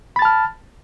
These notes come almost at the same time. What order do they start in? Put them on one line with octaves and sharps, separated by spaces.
B5 A6 A5 F6